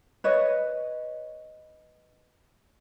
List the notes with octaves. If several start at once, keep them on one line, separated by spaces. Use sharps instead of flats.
B4 C#5 D#5